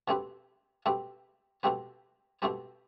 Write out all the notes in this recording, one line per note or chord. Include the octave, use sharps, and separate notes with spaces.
B2 A3 C4 G4 B4
B2 A3 C4 G4 B4
B2 A3 C4 G4 B4
B2 A3 C4 G4 B4